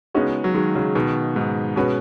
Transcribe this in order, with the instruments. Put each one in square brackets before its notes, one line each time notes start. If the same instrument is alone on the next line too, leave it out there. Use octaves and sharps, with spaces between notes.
[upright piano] C#3 B3 D#4 F#4 [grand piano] G#3 C#4
[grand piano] F#3
D#3 G#3
C#3 F#3
B2 D#3
G#2
[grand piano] B2 [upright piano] G#3 C#4 F#4 B4